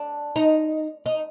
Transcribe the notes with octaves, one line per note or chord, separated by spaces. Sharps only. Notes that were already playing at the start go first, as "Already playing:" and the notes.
Already playing: D4
D#4
D#4